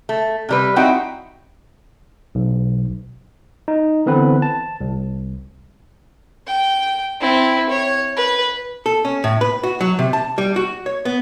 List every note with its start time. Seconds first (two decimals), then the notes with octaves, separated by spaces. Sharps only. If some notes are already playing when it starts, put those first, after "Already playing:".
0.09 A3
0.49 C3 G3 B4
0.76 C4 D#4 E4 F#4 F#5 G5
2.35 B1
3.68 D#4
4.06 D3 E3 B3 C4 B4
4.42 A5
4.81 C2
6.47 G5
7.21 C4 E4
7.69 C#5
8.16 B4
8.86 A4
9.05 C#4
9.24 A2
9.41 B4
9.63 F#4
9.81 F#3
9.99 C3
10.13 A5
10.38 G3
10.56 F#4
10.86 C#5
11.05 B3